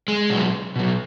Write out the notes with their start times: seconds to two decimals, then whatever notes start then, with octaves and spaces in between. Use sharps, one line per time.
0.08 G#3
0.30 B2 F#3
0.76 B2 F#3